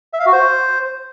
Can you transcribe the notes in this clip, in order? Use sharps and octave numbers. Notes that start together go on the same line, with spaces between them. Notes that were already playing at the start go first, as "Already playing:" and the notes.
E5
F5
F#4
C5